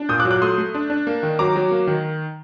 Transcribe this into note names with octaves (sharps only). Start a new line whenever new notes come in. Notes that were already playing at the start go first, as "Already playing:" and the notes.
Already playing: D4
A#2 D#6 G6
D6 F#6
F#3
D6 F#6
A3 C6 D#6
A3
D4
D4
A#3
D#3
F#3 A#5 D6
F#3
A#3
D#3